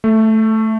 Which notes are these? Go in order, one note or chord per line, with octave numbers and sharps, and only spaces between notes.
A3